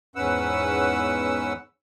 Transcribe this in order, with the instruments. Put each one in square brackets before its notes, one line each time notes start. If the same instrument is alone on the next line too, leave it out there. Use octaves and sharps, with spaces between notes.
[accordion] E2 G#2 C#4 B4 F#5 E6